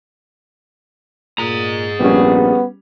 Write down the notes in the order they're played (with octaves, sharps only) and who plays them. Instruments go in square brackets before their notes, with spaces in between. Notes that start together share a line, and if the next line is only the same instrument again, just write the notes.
[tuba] A#2 [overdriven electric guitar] G#4 A#5
[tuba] A#1 [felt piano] G3 C#4 [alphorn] B3